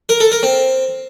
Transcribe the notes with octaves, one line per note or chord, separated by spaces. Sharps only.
A#4
A4
A#4
C4